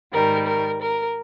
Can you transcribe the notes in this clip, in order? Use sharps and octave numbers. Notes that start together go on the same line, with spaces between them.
G#2 D#3 G3 A#4
A#4
A#4